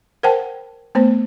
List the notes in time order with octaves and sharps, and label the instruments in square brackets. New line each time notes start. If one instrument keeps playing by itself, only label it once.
[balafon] A#4 C5 F#5 G5 A5
A3 B3 C5